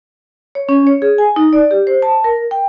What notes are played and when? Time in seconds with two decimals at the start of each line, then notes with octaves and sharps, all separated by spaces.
0.55 C#5
0.69 C#4
0.87 C#5
1.02 G#4
1.18 G#5
1.36 D#4
1.53 D5
1.71 G4
1.87 C5
2.02 A5
2.24 A#4
2.51 G5